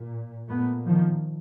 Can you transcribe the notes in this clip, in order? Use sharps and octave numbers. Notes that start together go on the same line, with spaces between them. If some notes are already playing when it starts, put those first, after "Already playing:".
Already playing: A#2
A#2 A3 B3
D#3 F3